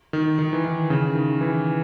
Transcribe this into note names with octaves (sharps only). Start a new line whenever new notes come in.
D#3
D#3
E3
D#3
C#3
D#3
E3